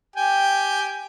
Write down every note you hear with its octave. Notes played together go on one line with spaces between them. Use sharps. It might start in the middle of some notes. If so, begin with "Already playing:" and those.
G4 G5 G#5